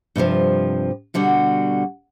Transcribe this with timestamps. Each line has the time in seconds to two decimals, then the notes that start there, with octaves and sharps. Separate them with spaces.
0.16 G2 C3 D#3 F3
1.14 B2 D3 G3 F#4